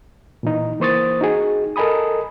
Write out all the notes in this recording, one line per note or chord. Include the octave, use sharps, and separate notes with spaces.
A#2 E3 D#4
E3 A#3 C5 C#6 D#6 A6
D#4 F#4 G#4
A4 A#4 D#5 G#5 B5 D#6